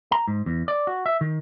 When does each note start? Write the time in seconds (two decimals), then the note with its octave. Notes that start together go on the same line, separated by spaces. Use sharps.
0.12 A#5
0.28 G#2
0.46 E2
0.68 D5
0.87 F#4
1.06 E5
1.21 D#3